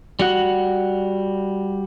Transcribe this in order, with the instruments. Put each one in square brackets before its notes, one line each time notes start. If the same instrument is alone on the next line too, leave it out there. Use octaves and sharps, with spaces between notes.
[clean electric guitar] G3 F#4 F#5